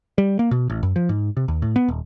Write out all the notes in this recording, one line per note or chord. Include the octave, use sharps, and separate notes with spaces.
G3
A#3
B2
A1
F#2
F3
G#2
C3
D#2
A2
B3
D#1